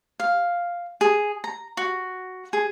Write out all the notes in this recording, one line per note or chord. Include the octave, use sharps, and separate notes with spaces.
F5
G#4
A#5
F#4
G#4